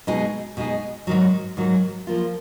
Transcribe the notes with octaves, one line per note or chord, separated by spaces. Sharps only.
B2 G#3 D#4 G#4
B2 G#3 D#4 G#4
G#2 D#3 F#3
G#2 D#3 F#3
F3 A#3 F4